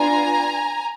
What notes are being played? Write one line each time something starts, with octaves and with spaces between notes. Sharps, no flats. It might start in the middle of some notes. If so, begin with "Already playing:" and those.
Already playing: B3 D4 F4 G#5 A#5